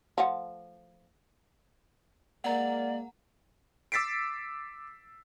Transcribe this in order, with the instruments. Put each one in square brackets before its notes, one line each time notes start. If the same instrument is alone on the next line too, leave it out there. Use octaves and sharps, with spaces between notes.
[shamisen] F3 A3 F#5
[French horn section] G#3 A#3 [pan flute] D5 [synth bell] F#5 A#5
[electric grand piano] D6 E6 A6 B6 C7 D7